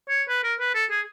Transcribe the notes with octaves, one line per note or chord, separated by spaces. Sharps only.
C#5
B4
A#4
B4
A4
G#4